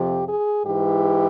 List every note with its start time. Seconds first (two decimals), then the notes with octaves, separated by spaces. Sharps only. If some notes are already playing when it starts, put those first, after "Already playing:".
Already playing: F2 C3 F3 G4
0.26 G#4
0.64 G#2 E3 G4